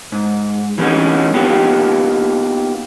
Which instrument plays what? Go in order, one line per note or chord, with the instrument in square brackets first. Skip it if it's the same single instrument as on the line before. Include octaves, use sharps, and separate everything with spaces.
[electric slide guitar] G#2
E3 G3 A3 C4 C#4 D#4
A#3 B3 D#4 F4 G4